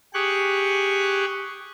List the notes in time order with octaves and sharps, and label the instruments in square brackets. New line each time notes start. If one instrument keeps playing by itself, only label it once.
[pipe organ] G4 G#4 C#6 F#6